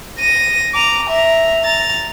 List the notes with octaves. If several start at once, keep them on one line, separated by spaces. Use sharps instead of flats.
A#6 D#7
A#5 D6
E5 A#5
A#5 A6